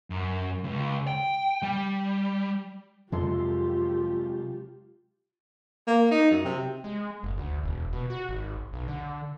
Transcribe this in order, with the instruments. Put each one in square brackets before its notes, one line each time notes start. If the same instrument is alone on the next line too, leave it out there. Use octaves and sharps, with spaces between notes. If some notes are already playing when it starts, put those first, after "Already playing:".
[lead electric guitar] F#2
C#2
G5
G3
[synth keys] F2 A4 C6 [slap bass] C3 F#3 G#3 [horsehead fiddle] F4 G4
[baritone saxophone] A#3
D#4
F#2
C3
[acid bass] G#3
F#1
D2
E1
B2
F#4
G#1
B1
D3